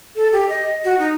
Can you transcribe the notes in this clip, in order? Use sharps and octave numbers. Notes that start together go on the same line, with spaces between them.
A4
G4
D#5
F#4
D#4